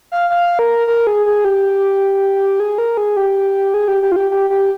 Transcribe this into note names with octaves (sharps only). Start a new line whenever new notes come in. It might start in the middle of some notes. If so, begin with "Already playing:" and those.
F5
F5
A#4
A#4
G#4
G#4
G4
G#4
A#4
G#4
G4
G#4
G4
G4
F4
G4
G4
G4